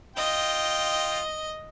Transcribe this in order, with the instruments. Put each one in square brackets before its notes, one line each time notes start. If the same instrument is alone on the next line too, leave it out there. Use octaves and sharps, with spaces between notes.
[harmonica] F4 G5 [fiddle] D#5